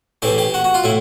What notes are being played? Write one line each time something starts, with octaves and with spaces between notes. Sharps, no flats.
A2 E3 G4
G4
F#4
F#4
F4
A2 E4